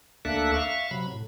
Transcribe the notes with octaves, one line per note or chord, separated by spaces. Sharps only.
D2 A#3 D4 A4 E5 F#6
E5 F5 C#6
C3 F#3 B5
A2